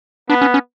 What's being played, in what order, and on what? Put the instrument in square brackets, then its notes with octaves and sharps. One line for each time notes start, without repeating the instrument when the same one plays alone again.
[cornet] B3 [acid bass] D4
[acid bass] C#4
C#4